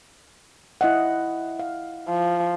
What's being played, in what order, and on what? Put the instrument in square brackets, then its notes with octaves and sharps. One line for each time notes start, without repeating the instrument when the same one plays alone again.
[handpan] E4 D#5 F#5
F5
[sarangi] F3